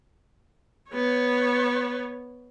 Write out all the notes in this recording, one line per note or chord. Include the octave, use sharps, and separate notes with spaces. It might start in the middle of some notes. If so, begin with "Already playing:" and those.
B3 C#5